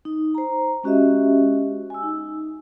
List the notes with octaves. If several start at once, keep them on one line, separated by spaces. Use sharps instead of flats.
D#4
C5 A#5
G#3 C#4 F#4 G4 D#5 E5
G#5 E6
D#4